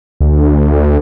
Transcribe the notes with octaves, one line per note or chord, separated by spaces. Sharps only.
D2